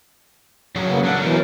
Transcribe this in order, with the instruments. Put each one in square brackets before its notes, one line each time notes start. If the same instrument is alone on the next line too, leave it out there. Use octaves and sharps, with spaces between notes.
[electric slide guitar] F#3 F#4 G#4
[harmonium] C#3 A#3 B3
[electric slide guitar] F#3 A3 D4 [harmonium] F#5
[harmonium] B2 E3 F#3 [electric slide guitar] A3 A#4